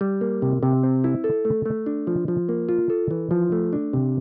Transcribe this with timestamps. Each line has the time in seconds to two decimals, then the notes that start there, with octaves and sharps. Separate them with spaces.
0.01 G3
0.21 A#3
0.42 C3
0.63 C3
0.83 C4
1.04 E4
1.24 A4
1.45 A3
1.66 A3
1.86 D4
2.07 F3
2.28 F3
2.49 A#3
2.69 F4
2.90 A4
3.11 E3
3.31 F3
3.52 A3
3.73 D4
3.93 C3